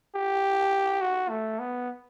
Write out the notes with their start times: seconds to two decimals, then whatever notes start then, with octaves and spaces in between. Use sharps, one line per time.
0.15 G4
1.01 F#4
1.29 A3
1.59 B3